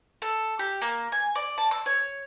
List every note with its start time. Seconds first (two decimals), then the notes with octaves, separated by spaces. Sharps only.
0.22 A4
0.59 G4
0.82 A#3
1.12 G#5
1.35 D5
1.58 A5
1.71 E6
1.86 C#5